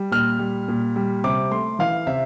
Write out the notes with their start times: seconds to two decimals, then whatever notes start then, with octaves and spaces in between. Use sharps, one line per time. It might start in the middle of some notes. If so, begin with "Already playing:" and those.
Already playing: G3
0.11 A#2 F6
0.39 G3
0.68 A#2
0.96 G3
1.24 C3 D6
1.51 A3 C6
1.79 E3 F5
2.07 C3 E5